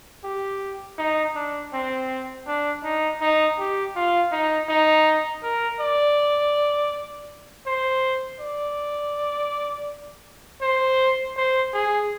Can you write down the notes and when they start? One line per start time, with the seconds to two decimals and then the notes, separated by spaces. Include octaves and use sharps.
0.24 G4
0.98 D#4
1.35 D4
1.73 C4
2.47 D4
2.83 D#4
3.21 D#4
3.59 G4
3.95 F4
4.32 D#4
4.69 D#4
5.43 A#4
5.80 D5
7.66 C5
8.40 D5
10.62 C5
11.37 C5
11.74 G#4